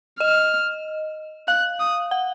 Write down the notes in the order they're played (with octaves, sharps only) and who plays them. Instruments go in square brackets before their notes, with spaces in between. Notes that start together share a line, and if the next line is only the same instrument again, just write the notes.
[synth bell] D#5 [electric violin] F6
[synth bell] F5 [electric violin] F#6
[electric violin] D#6
[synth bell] F#5